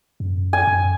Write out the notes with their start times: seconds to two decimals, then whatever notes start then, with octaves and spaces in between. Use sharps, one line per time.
0.20 F#2
0.53 G#5
0.67 F#2